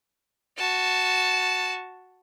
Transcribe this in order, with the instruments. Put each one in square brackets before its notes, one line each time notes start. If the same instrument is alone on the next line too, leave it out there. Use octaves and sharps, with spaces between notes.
[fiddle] F#4 A5